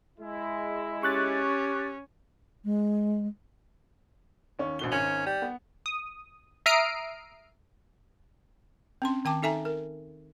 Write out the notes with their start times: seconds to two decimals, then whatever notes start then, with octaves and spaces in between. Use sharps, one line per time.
0.19 G#3 E4
1.03 C#4 G4 C#6 F#6 A6
2.65 G#3
4.59 D#2 C#4 C#6
4.79 A#1 B2 G7
4.92 G#1 C#4 C#7 F#7
5.26 G3
5.42 B3
5.86 D#6
6.66 E5 A#5 D#6 F6 C7 D7
9.02 C4 C#4 C6
9.25 D#3 G5 A5 D6
9.42 D#4 A4 E5 G#5 A#5
9.65 A#4